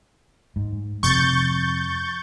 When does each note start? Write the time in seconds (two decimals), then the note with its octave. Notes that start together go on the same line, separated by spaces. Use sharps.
0.56 G#2
1.03 F2 C3 C#6 G6 A6